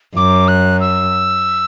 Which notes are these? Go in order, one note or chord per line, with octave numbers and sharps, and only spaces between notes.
F#2 D6
F#6
E6